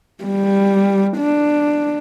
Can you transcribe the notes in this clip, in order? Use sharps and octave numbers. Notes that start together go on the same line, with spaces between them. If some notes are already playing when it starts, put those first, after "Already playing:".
G3
D4